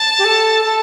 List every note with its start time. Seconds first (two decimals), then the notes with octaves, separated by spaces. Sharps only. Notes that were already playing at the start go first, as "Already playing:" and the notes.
Already playing: A5
0.19 G4
0.25 A4
0.65 A4